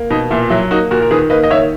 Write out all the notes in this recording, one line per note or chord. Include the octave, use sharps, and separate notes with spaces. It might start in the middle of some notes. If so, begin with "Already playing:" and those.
Already playing: A#3
B2 D#4
A#2 E4
F#3 E4
A#3 D#4 F#4
A#2 F#4 A#4
A#4
D#3 G#4 B4
A#3 B4 D#5
D#5
D#3 C#5 E5